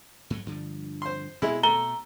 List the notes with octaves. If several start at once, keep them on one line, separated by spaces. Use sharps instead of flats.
G#2 F#3 A3
G2 D3 F3
C5 C6
B2 G#3 E4
A3 A#5 G7